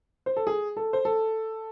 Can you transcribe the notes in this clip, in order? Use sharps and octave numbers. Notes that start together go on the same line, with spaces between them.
C5
A4
G#4
A4
C5
A4